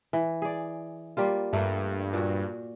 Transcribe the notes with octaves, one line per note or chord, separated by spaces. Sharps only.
E3
G#4 D5
G3 A#3 F4
G2 A3 A#3
A#2 F#4